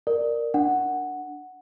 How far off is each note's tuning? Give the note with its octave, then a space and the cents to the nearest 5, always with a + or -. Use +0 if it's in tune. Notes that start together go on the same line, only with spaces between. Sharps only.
A#4 +0 D5 +15
D4 +0 F#5 +0